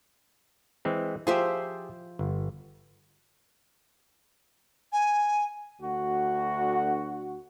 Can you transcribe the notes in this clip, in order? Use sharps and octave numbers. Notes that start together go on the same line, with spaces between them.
E3 G#3 C4
F3 G4 G#4 C5 E5
G1
G#5
D2 F#4